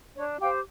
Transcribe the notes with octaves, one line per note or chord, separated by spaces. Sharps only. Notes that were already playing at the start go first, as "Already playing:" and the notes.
D4 C#5
G4 C5 F5 G5